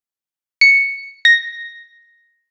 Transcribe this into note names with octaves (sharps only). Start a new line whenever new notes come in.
C#7
A#6